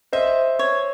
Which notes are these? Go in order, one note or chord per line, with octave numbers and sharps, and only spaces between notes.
C5 D#5 E5
C#5